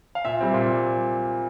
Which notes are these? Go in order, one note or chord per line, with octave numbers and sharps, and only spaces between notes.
F5
A#2 E5
G3 C4
A#2